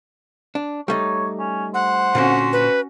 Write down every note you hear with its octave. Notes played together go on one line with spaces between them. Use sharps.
D4
G3 A3 D#4 C#5
C#4
C5 F#5
A#2 D3 C4 C#4 F#4
B4